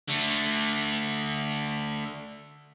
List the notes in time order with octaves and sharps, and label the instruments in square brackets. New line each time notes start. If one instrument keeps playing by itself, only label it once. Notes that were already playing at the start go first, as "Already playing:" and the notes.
[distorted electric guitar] D3 A3